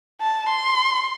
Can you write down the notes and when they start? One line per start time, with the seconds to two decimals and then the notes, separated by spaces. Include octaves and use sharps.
0.21 A5
0.49 C6